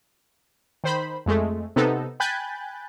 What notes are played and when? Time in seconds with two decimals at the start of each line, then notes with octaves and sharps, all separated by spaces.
0.84 D#3 C5 B5
1.26 F2 G#3 A3
1.76 C3 B3 D#4 A4
2.20 G5 G#5 B5 F#6 G6 A6